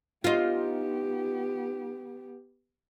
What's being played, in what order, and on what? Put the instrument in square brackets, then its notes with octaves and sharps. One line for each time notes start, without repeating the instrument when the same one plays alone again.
[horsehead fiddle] B3 G4 [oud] D#4 F4